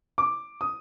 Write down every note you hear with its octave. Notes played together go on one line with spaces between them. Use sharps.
D6
D#6